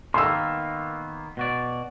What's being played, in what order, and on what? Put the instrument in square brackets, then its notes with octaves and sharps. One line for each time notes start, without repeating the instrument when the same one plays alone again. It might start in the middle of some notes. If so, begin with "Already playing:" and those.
[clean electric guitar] D#3 A#3 B3 [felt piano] C6 E6
[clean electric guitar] B2 F#4 D5